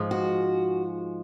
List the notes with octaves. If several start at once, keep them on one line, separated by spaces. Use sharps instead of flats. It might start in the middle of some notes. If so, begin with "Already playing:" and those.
Already playing: G#2 F3 G#3
F#4